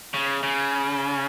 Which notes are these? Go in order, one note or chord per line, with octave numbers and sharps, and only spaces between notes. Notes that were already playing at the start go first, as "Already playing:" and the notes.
C#3
C#3